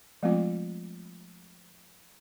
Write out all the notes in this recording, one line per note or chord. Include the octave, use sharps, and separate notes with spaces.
F3 G#3 A3 B3 C4 F4